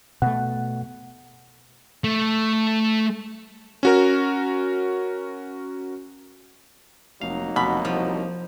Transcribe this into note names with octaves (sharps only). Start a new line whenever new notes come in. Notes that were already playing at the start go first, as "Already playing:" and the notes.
B2 A3 F#5
A3
C#4 F#4 A#4
F1 F#3 A#3 D#4 F5
F1 B2 D3 B5
C2 F3